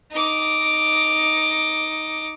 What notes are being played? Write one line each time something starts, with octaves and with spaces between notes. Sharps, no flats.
D#4 D6